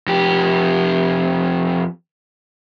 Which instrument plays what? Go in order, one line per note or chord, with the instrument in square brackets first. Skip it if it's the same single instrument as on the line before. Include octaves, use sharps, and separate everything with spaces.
[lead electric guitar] F2 G4